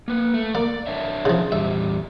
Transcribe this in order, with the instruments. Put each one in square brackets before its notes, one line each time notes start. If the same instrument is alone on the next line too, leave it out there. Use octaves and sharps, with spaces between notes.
[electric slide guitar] A#3 B4
A3
[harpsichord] A#3 [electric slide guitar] D5
[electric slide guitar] D4 C#5 E5
[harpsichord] C#3 F3
[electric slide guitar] E2 G3 [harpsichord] E5